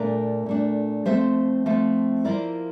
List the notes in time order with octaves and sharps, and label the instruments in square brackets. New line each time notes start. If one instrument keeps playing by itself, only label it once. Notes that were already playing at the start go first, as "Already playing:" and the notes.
Already playing: [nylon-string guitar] A#2 A3 D4 A#4 D5
A#2 A3 D4
F3 A3 C4 C5 E5
F3 A3 C4
F3 A#3 E4 A#4 D5